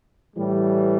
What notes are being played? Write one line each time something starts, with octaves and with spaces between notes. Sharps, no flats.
A2 E3 G3